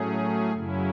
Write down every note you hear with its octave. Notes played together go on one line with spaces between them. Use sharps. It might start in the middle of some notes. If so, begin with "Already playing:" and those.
Already playing: A2 F#3 A3 C#4 G#4
F#2 C#3 F#3 C#4 E4